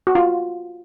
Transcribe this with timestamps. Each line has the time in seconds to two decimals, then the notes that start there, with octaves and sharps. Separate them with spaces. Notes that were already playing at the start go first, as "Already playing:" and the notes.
0.07 F#4
0.15 F4